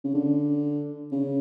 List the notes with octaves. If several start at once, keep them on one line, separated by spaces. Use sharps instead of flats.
C#3
D3
C#3